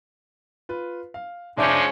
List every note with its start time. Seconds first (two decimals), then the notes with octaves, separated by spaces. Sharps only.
0.69 F4 B4
1.14 F5
1.57 F1 F3 G#3 C#4 D4 E5 G6